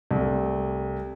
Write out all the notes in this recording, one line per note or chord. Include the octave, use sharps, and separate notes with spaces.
C2 A3